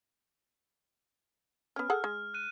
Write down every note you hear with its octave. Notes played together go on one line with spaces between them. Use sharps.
B3 C#4 F6
G#4 A4 F#5
G#3
F#6 D#7